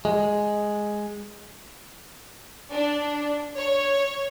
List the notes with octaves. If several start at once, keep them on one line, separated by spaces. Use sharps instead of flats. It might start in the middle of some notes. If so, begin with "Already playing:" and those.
G#3
D4
C#5